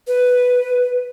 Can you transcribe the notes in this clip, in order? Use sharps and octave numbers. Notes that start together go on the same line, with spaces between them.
B4